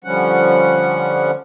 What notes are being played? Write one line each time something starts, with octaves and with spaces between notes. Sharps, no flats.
D3 F3 G3 C#4 F#5